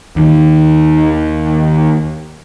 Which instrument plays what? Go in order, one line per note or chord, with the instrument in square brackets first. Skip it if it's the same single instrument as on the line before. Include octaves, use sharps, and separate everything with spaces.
[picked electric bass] D#2 D#3